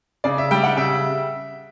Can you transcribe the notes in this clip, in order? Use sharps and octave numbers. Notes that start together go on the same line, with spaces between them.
C#3 D5
E5
G3 G5
F#5
C#3 E5